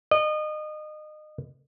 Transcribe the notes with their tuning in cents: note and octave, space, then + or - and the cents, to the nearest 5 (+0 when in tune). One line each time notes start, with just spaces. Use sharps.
D#5 -30